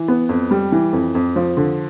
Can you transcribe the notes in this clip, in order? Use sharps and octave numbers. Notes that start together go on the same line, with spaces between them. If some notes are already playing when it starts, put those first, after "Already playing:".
Already playing: E3
B3
F2
G3
E3
F2
F2
F3
D3